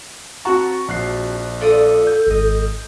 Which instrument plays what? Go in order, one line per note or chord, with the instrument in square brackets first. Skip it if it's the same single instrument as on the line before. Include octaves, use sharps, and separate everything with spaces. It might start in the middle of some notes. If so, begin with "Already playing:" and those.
[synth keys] C4 F#4 A5 [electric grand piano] F#5 A#5 C#6
[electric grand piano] A#1 F#6 C7
[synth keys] F4 D5 D#6 [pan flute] A4
[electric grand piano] G6
[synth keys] G#1 D#5